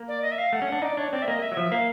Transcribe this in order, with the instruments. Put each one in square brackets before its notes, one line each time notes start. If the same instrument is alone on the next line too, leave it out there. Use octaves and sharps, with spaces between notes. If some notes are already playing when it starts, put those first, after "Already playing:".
Already playing: [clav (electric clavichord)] A#3
[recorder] D5
D#5
E5
F5
[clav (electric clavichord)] A3 [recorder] F#5
[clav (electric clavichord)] C#4
D4
[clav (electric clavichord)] D#4 [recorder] D5
[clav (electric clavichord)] D4 [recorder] C#5
[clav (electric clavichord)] C4 [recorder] D5
[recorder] E5
[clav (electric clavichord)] A#3 [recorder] D#5
[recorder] E5
[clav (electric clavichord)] F#3
F3
[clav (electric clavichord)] A#3 [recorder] F5